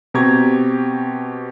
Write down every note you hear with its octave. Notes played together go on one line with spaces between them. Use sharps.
B2 C4 G4 A#5 C#6 G#6